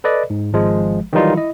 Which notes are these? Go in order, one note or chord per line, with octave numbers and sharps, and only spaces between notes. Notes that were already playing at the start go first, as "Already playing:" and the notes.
A4 B4 D5 D#5
G#2
G#1 F3 G#3
D#3 E3 F#3 G3 D#4 F4
E4 D#5